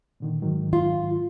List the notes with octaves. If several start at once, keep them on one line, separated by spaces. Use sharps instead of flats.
A#2 D3 D#3
G#2 D#3 F#3
F4